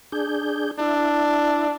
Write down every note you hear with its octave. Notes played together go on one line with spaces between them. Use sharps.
D4 G#4 G6
D4 E4